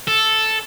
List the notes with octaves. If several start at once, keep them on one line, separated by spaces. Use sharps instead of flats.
A4